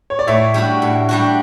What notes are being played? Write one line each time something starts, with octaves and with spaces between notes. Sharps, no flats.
C#5
D5
A2 C#5 E5
G3 D4 F#4
A2
G3 D4 F#4